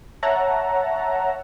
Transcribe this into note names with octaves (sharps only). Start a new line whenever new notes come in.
C#5 E5 F#5 A5 A#5